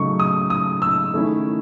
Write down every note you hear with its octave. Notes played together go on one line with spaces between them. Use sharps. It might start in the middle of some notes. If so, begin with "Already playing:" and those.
Already playing: C#3 F#3 A3 D#4 C#6
D#6
D#6
E6
D#3 A3 C#4 E4